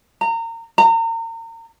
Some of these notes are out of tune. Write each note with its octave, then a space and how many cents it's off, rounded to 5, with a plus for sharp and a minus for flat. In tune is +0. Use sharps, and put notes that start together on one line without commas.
A#5 -30
A#5 -35